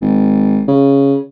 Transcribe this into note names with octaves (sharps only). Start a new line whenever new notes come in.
G#1
C#3